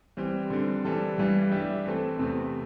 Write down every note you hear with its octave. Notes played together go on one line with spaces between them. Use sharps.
E3 G3 C4
D3 G3 C4
E3 G3 D4 A4
G2 E3 G3
G3 D4 G4 E5
E3 A3 C4 A4
E2 C3 A3